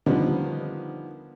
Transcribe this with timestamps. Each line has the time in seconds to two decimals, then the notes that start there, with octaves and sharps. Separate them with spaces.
0.06 D3 D#3 F3 G3 B3